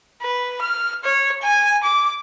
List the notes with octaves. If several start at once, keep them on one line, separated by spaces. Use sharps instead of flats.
B4
F6
C#5
G#5
D6